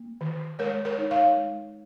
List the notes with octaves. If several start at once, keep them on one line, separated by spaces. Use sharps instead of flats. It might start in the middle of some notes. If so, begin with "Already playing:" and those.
Already playing: A#3
D#3
G#3 A#4 C#5
A#4 C#5
D#4
C#5 F5
G#3